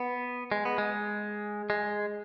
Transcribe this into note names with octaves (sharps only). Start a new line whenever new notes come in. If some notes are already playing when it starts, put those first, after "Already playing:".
Already playing: B3
G#3
B3
G#3
G#3